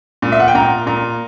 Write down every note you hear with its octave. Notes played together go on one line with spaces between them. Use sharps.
A#2
E5
F#5
G5
A#2 A#5
A#2 A#5